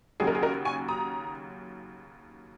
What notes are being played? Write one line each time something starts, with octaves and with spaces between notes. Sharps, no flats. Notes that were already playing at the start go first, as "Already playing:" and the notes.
D#2 C#3 F#3 G#4
A#4
G#4
F#4 A#4
G#5 C#6
A#5 D#6